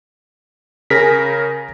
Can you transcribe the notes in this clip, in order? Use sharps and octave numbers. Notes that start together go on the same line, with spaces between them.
C#3 G#4 A#4 G#5 A#6 B6